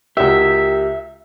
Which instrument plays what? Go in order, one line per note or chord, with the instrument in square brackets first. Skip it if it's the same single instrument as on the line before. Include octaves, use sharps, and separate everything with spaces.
[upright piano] C#2 F#4 E6 [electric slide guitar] G4 A#4 [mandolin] E5